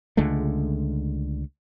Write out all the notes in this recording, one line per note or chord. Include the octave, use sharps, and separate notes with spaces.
C#2 D3 G#3 A3